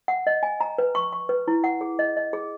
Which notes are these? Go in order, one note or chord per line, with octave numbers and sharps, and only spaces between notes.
F#5
D#5
G#5
A#5
B4
C#6
C#6
B4
E4
F#5
G#4
D#5
D#5
G#4